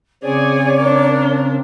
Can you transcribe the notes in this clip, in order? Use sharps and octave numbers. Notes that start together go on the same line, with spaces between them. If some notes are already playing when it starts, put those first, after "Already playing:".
C#3 C4 G#4 C#5 D5 G#5
D4 A#4